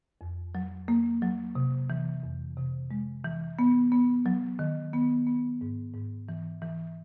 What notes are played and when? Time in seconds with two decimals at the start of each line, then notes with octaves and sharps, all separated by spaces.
0.21 F2
0.55 F#3
0.88 A#3
1.22 F#3
1.55 C3
1.90 E3
2.23 F2
2.57 C3
2.91 G#3
3.24 E3
3.59 B3
3.92 B3
4.26 F#3
4.59 D#3
4.93 B3
5.27 B3
5.61 G#2
5.94 G#2
6.29 E3
6.62 E3